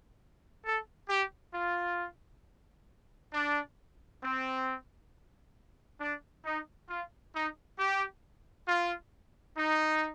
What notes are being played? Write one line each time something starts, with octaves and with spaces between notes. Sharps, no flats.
A4
G4
F4
D4
C4
D4
D#4
F4
D#4
G4
F4
D#4